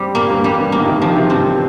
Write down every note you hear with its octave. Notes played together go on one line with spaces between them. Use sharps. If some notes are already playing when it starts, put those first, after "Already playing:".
Already playing: G3 C4
A#2 A#3
G2
F2 G3
G2
A#2 A#3
D#3
C3
D#3 F3
C3
G2 C4